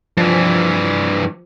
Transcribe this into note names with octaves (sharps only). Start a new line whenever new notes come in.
G2 E3 F3